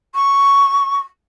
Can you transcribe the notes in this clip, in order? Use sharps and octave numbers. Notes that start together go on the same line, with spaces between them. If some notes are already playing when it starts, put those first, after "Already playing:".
C#6